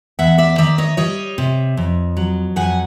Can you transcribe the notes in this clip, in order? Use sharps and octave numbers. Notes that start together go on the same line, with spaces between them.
E2 E5 F#5
D5 E5
D#3 D5 E5
C#5 D#5
G3 C#5 D#5
C3
F2
F#3
F2 F#5 G#5